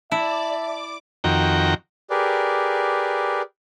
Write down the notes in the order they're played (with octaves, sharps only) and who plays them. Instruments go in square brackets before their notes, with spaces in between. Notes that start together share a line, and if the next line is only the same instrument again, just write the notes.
[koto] E4 [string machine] D5 D6 [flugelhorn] E5 [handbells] A5
[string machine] D6
[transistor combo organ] F2 D#3 F#4 G5 A#5
[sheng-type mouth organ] G4 G#4 A#4 B4 D5